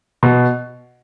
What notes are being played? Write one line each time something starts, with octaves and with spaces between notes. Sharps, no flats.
B2